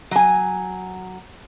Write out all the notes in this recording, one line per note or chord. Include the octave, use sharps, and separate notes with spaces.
F#3 G#5